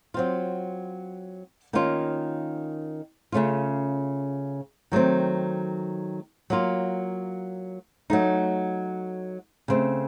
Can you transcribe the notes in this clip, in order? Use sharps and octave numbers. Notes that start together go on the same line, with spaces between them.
F#3 C4 F4
D#3 A#3 C#4 F4
C#3 A3 C#4 F4
D#3 F#3 A3 C4
F#3 A#3 F4
F#3 A3 D#4
C#3 A3 C4